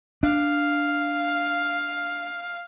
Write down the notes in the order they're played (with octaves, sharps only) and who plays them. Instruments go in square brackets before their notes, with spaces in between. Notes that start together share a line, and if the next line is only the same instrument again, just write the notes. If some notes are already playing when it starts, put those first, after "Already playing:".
[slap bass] D4 [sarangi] F5